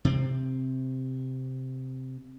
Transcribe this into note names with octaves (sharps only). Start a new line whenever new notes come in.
C3 C4